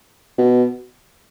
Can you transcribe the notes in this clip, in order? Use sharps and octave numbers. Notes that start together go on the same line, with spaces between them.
B2